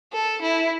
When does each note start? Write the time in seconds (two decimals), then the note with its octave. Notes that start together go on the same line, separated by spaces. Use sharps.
0.13 A4
0.42 E4